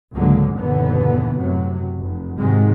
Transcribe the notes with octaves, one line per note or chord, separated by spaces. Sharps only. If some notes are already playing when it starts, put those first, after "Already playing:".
C#2 G#2 D3 F#3 G#3 A#3
F#1 D#2 A#2 D3 E3 B3
F#2 A2 C3 F#3
F1
G#2 C3 D#3 F#3 G#3 C4